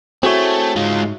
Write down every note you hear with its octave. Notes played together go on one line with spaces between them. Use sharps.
A3 C4 E4 F#4 G#4 C#5
G#2 G#3 F4